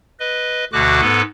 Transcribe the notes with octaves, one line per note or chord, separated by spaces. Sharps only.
B4 D#5
D2 B2 D3 F#4 D6 F#6
G#2 B3 A4 B4